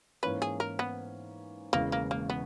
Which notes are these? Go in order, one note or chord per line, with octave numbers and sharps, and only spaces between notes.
G#2 E3 A#3 C#4 B4
G#4
A#4
B3
E1 E2 C#3 G#3 A#3
A#3
A#3
B3